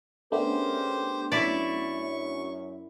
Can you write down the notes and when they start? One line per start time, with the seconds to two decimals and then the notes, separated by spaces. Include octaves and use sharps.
0.32 A3 B3 C#4 D4 G4 G#4 A#4 C5
1.32 F#2 E4 D5 C#6